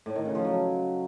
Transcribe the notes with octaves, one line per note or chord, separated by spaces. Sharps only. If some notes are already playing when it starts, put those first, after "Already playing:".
A2
D#3
C#3
F3
F#3